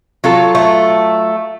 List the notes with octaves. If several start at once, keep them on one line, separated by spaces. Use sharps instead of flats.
F#3 F4 A4
A3